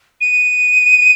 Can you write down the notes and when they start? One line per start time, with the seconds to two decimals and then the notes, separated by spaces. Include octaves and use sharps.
0.21 D#7